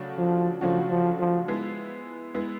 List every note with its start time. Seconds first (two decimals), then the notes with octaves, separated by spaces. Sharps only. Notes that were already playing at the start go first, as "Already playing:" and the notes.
Already playing: C#3 F#3 A3 D4 F#4
0.18 F3
0.61 C#3 F3 F#3 A3 D4 F#4
0.90 F3
1.19 F3
1.48 G#3 B3 E4
2.34 G#3 B3 E4